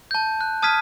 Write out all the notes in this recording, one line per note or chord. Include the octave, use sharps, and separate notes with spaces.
A5 G6
F#6
A5 D#6 F6 G#6 B6 D#7